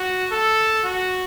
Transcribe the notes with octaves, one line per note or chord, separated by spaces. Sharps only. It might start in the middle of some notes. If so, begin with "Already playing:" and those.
Already playing: F#4
A4
F#4